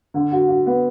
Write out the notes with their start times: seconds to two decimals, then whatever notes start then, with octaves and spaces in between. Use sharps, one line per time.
0.14 D3
0.32 F#4
0.48 F#4
0.66 B3